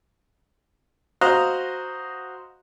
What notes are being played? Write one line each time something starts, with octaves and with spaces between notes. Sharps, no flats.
F#4 C5 D#5 F5 A#5 F#6